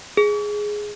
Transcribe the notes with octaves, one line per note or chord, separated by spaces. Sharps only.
G#4